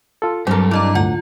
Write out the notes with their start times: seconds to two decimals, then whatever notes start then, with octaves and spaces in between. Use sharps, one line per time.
0.22 F4 A4
0.47 G2 F#3 C4 G4 A4 A#4
0.71 G3 D4 E4 D#5 A#5
0.95 D2 A2 F4 F#5